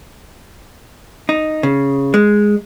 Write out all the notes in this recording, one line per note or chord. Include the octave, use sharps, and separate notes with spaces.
D#4
C#3
G#3